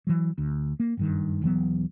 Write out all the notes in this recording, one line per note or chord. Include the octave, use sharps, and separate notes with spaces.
E3 F#3
D2
A#3
F#1 G2 D#3
D#1 E3 F#3 B3